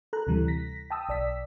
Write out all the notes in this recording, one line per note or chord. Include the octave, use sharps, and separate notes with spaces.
A4 A#5 F#6
D2 C3 E3 G3
A#6 B6
G5 A5 D#6 E6
B1 D5 E6 B6